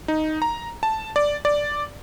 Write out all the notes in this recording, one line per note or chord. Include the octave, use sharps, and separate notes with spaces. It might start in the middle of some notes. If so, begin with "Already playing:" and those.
D#4
A#5
A5
D5
D5